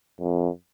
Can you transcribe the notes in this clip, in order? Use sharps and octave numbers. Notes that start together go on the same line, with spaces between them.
F2